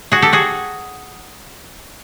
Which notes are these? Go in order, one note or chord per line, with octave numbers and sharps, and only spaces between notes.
F#4 G#4
G4 A4
F#4 G#4